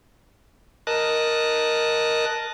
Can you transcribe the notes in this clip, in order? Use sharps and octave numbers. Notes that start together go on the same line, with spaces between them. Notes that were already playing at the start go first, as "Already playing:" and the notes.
A#4 D#5 A5 F#6